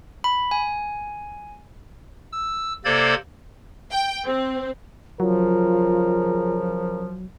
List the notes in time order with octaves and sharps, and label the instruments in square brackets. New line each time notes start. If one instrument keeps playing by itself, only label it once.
[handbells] B5
G#5
[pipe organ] E6
C3 A#3 A4 C5 D5 G#6
[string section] G5
C4
[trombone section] C#3 A#4 [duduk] F3 [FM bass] F#3 [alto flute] F4